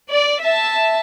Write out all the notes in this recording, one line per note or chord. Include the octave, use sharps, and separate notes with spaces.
D5
E5 A5